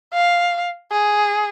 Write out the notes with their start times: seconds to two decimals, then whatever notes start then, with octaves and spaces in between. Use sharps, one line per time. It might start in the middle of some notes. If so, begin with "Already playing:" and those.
0.13 F5
0.91 G#4